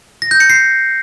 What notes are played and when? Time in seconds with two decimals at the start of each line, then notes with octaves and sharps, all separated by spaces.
0.22 A#6
0.31 G6
0.40 C#7
0.50 C7